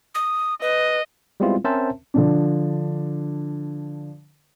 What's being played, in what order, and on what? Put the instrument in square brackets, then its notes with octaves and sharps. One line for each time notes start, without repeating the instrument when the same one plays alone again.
[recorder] D#6
[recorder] B4 [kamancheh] D#5
[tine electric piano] G3 G#3 B3 C4 E4 F4
C4 C#4 A#4 C5 E5 A5
[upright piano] D3 F3 D4